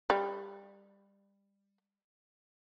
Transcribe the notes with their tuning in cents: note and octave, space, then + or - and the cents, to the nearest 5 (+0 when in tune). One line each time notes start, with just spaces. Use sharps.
G3 +25